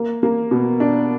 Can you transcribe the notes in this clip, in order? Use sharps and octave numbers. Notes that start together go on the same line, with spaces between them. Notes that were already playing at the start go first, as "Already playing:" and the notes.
Already playing: A#3
A#3
B2
D4